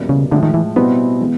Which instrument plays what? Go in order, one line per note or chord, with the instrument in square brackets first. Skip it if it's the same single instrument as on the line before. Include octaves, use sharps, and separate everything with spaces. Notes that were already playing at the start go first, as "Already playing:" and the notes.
Already playing: [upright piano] E2 B2 G3 A#3 C#4
[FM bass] C#3
[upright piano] A2 F3 G#3 [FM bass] D3
[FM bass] D#3
E3
[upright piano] B2 G3 C4 E4 [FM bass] B3
[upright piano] E3 G#3